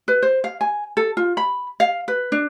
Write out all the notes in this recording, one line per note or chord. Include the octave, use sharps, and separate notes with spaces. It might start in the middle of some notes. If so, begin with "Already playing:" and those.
B4
C5
F5
G#5
A4
F4
B5
F5
B4
D4